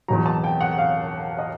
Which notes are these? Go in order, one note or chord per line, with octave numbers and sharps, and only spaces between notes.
E2 B2 F#3 A#5
A5
G5
F#5
F5
D#5